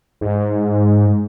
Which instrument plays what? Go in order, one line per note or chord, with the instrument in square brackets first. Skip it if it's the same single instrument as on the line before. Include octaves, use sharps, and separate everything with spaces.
[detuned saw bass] G#2